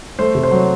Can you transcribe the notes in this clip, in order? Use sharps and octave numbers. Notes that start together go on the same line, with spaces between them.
A3 C5
C3
C5
F#3